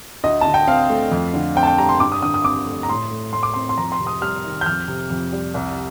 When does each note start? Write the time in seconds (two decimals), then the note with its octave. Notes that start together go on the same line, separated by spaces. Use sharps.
0.23 D2 D#5
0.41 D3 A5
0.54 G5
0.67 C4 F5
0.90 A3
1.12 F2
1.34 D3
1.56 C4 G5
1.63 A5
1.67 G5
1.78 G3 A#5
1.89 C6
2.00 G2 D6
2.12 D#6
2.22 D3 D#6
2.34 D#6
2.44 C4 D6
2.67 A3
2.83 A#5
2.89 A2 C6
3.11 A3
3.33 A2 C6
3.43 D6
3.54 C4 C6
3.69 C6
3.78 F2 A#5
3.92 C6
4.00 C3
4.07 D#6
4.21 G3 F6
4.45 D#3
4.61 G6
4.66 F2 F6
4.88 C3
5.10 F2
5.33 G3
5.54 C2